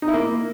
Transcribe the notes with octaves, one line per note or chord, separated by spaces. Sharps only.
D#4
E4
A#3